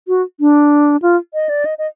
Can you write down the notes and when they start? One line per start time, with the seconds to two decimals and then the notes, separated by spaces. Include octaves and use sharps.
0.08 F#4
0.40 D4
1.02 F4
1.34 D#5
1.49 D5
1.65 D#5
1.78 D#5